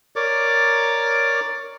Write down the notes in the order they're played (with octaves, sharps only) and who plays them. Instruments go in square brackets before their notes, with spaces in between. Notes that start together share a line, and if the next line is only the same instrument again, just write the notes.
[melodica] A#4 C#5 D5 D6